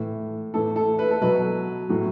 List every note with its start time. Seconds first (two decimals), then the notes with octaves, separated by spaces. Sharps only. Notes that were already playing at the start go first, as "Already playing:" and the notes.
Already playing: A2 E3
0.54 A2 E3 A4
0.76 A4
0.99 B4
1.11 A4
1.21 B2 F#3 B4
1.89 A2 F#3